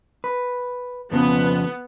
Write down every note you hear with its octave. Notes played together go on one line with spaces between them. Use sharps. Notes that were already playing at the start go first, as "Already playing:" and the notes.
B4
F2 C#3 F3 B3